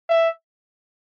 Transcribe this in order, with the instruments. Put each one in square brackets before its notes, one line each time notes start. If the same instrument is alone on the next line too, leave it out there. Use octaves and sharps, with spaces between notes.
[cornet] E5